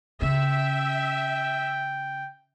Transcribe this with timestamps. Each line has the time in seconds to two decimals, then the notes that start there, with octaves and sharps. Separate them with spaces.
0.22 C#3 E5 G5